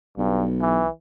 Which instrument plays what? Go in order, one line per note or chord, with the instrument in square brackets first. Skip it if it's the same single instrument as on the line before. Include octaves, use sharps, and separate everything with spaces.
[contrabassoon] B1 [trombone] G2
[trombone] E3